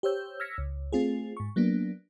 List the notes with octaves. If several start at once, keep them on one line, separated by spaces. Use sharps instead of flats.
G4 C5 C#5 E6 G6
E6 F6 G#6 A#6 B6 C#7
C#2
A3 C4 F4 G#4
G#2 C#6
F#3 A#3 B3 D4